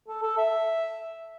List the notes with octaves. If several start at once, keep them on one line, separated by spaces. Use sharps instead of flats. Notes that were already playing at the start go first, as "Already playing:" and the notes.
A4
A4
E5